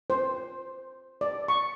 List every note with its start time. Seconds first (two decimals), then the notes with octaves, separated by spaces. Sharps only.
0.10 C5
1.21 D5
1.48 C#6